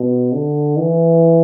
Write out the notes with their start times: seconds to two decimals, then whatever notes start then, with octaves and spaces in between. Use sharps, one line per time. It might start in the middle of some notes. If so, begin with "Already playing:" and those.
Already playing: B2
0.34 D3
0.77 E3